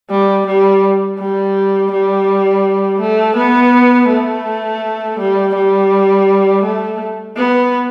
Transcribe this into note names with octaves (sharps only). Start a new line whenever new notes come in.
G3
G3
G3
G3
A3
B3
A3
G3
G3
A3
B3